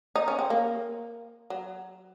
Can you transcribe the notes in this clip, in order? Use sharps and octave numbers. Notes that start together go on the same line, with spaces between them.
D#4
C#4
C4
A#3
F#3